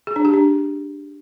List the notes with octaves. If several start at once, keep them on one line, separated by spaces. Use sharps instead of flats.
G#4
D4
G4
D4